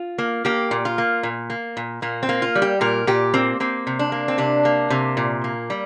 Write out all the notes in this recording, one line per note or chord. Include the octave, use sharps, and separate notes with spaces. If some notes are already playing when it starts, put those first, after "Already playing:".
Already playing: F4
A#3
A#3 G4
A#2
F4
A#3
A#2
A#3
A#2
A#2 A#3
C4
A#3
F4
G3
G4
A#2 A#4
A#2 G4
A#3 C4
A#3 C4
C3
D4
A#3
C4
C3 D4
A#3
C3
A#2
A#3
G3